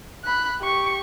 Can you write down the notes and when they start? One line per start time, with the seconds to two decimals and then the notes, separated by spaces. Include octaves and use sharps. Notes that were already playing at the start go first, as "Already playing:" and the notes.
0.24 B5 F#6
0.60 G4 C#6